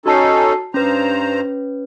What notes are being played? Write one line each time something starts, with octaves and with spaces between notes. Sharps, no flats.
C#4 D#4 F#4 A4 A5 C7
G2 C#4 B4 C5 A#5